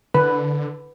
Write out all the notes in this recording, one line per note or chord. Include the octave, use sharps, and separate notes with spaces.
D3 B4